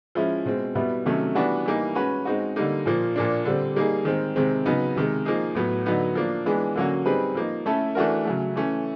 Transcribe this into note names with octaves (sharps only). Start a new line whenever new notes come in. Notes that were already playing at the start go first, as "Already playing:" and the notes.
F3 G#3 C#4 E4
B2 G#3 C4
B2 G3 B3 E4
C3 D#3 F#3 A3 C#4
E3 G3 B3 D4 F#4
E3 G3 A#3 D#4
G#3 C#4 F#4 B4
G#3 C4 D#4 F#4
D3 G3 A#3 D#4
A#2 F3 A#3
A#2 F3 A#3 D4
D3 G3 C4
G3 A#3 D#4 G#4
D#3 G#3 C4
C3 D#3 G#3 C4
C#3 F#3 B3 D#4
C3 D#3 G#3
F3 A#3 D#4 G#4
A2 F#3 B3
D3 F#3 B3 D#4
F3 A#3 D4
E3 G#3 B3 D4
D3 F#3 A#3 C#4 F#4
G3 C4 D#4 G#4 B4
F3 A#3 D#4
A3 C#4 E4 A4
E3 A3 D4 F#4 A#4
C#3 F#3 A3
E3 A3 C#4